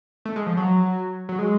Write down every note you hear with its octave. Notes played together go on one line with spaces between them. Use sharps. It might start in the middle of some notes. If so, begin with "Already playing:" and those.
A3
G#3
F3
F#3
F#3
G#3